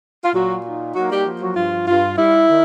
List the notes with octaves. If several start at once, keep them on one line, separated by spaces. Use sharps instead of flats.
F4
A#2 F#3 F#4
D#4
F#3 A#3 F#4
G3 G4
F3
F#3 F#4
G2 F4
G2 F4
G3 E4
D#3